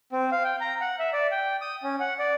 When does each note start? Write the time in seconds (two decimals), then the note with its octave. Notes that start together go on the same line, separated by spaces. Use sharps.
0.12 C4
0.32 F5
0.44 G5
0.61 A#5
0.81 F#5
0.99 E5
1.13 D5
1.31 G5
1.61 D#6
1.83 C#4
2.00 F#5
2.19 D5